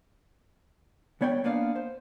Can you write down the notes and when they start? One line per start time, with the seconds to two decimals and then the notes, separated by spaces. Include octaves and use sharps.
1.21 C2 B3 C#5 D5 G5
1.44 A#3 B3 D4 D5 F5
1.76 C5